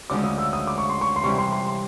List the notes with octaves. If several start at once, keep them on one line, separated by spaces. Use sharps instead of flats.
D2 C#3 F3 G#3 C#4 D6
D#6
E6
D#6
D6
C#6
C6
C#6
C6
C3 E3 G3 C#6
C6
C6
C6